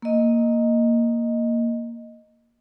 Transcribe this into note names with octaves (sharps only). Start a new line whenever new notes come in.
A#3 D#5